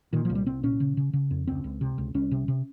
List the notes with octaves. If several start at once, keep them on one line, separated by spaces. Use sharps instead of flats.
A#2 D#3
C2 F3
G3
C2 C4
A#2 C#4
C#3
C#3
C#3
F2
C#2 C4
C#2
C3
C#2
C2 C#4
C3
C3